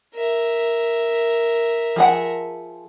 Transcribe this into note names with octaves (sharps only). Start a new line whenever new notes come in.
A#4 E5
F3 G#4 F#5